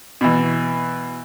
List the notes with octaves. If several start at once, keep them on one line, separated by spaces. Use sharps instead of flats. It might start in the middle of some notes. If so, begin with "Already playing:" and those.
B2 E3